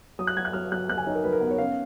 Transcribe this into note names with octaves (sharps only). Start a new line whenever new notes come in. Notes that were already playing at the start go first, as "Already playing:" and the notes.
F#3 D#6
F#6
F#3 G#6
F#6
F#3 F6
F#3 F#6
F#3 F#6
G#5
D#4 C#5
A#4
F#3 B4
A#4
B3 B4
C#5
C#4 F5